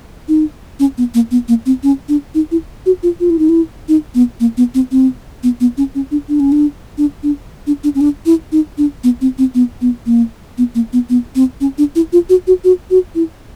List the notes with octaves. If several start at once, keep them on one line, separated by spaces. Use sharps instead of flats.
D#4
C#4
B3
A#3
B3
A#3
C4
C#4
D4
D#4
E4
F#4
F4
F4
E4
D#4
E4
D#4
B3
A#3
B3
C4
C4
B3
B3
C#4
C#4
D4
D4
C#4
D4
D4
D4
D4
D4
C#4
D4
E4
D#4
D4
B3
C4
C4
B3
B3
A#3
B3
A#3
B3
B3
C4
C#4
D4
E4
F4
F#4
F#4
F#4
F#4
E4